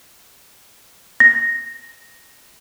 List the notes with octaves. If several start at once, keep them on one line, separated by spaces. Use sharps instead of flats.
A#6